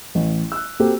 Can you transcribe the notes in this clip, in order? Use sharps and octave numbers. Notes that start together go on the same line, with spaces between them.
A1
E6 F#6
A#3 C4 F#4 G4 A4